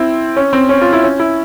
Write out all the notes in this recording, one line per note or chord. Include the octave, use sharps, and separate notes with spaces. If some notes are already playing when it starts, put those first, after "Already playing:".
Already playing: C4 E4
C#4
C4
C#4
F4
E4
C#4
E4